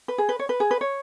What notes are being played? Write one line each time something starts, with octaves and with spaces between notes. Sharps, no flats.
B4
G#4
B4
C#5
B4
G#4
B4
C#5